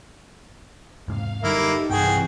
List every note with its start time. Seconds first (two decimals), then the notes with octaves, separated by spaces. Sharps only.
1.08 E2 G#2 C3 F5
1.43 F#2 D3 G3 A#3 D#4 E4 G4 A4
1.90 B1 G2 C3 E3 F#4 G#4 G5